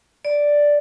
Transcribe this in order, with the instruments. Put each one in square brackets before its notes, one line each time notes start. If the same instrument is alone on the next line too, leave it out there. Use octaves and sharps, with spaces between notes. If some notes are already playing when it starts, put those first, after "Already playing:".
[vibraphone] D5